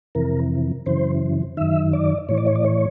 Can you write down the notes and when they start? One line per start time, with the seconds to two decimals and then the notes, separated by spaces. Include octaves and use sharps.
0.15 F2 C3 E3 A#4
0.86 F#2 C#3 E3 C5
1.57 F#2 D#3 E5
1.93 D5
2.29 A2 E3 C#5
2.38 D5
2.47 C#5
2.56 D5
2.65 C#5